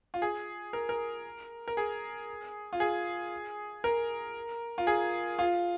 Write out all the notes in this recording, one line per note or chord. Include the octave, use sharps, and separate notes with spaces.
F4
G#4
A#4
A#4
A#4
G#4
F4
G#4
A#4
F4
G#4
F4